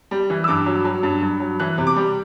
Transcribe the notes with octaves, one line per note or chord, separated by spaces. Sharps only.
G3
E3
E6
G2 D6
F#3
F#3
G2
G2
F#3
E3 F#6
C3
D6
G3